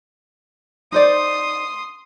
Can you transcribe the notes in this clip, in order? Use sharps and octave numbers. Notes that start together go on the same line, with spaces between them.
D#4 C5 D5 C6 D#6